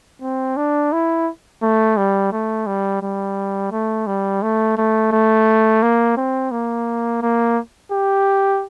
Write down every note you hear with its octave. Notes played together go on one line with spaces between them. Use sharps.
C4
D4
E4
A3
G3
A3
G3
G3
A3
G3
A3
A3
A3
A#3
C4
A#3
A#3
G4